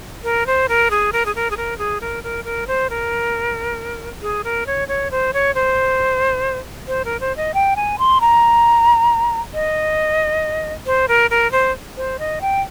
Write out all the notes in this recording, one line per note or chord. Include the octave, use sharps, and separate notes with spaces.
A#4
C5
A#4
G#4
A#4
G#4
A#4
G#4
A#4
G#4
A#4
A#4
A#4
C5
A#4
G#4
A#4
C#5
C#5
C5
C#5
C5
C5
A#4
C5
D#5
G5
G#5
C6
A#5
D#5
C5
A#4
A#4
C5
C5
D#5
G5